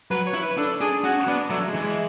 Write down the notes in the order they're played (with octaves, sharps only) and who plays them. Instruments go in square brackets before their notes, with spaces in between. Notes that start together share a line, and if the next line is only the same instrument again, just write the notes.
[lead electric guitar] F#3 [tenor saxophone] B4
[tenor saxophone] C#5
[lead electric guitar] E4
[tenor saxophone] B4
[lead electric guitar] D4 [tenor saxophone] A4
[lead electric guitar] D4 [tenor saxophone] G#4
[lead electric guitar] C#4 [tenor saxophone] F#4
[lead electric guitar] B3 [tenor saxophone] D4
[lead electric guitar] F#3 [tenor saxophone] A3
[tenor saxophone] G#3
[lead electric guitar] E3
[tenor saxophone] G#3